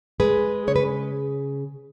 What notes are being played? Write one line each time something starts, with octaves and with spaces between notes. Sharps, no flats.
G#3 G#4 B4
C#3 C#5
B4